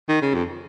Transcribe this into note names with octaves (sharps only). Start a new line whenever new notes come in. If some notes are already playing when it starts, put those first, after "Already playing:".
D#3
C#3
F2